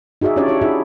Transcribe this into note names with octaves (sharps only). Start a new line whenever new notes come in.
D#4 F#4 G#4 D5 E5
C#4 D4 F4 G4 C#5 D5
E4 G4 C#5
D#4 E4 F#4 G#4 E5